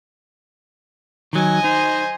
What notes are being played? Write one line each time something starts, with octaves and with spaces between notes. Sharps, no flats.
D#3 F#3 D#5 G#5
D#4 C5